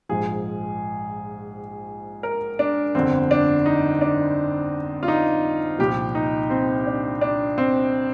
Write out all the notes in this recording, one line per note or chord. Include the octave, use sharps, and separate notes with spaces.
A#1 G#2 F3 G#4
A#4
D4
G1 F2 D3 C4
D4
D#4
D4
F4
D#4
C2 A#2 F3 G4
D#4
C4
D4
D4
C4